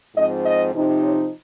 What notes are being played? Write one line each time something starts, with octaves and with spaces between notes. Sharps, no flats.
G#2 F3 C4 D#5
D#5
C3 F3 C4 D#4
C#5